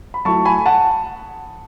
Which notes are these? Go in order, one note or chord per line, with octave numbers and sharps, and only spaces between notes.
B5
F#3 A3 E4 A5 C#6
G#5 B5
F#5 A5